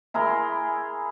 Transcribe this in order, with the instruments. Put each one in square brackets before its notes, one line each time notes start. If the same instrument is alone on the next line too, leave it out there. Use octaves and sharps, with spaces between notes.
[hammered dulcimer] E4 G#4 A#4 C6